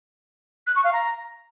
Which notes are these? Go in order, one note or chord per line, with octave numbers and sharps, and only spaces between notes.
F#6
C#6
F5
A#5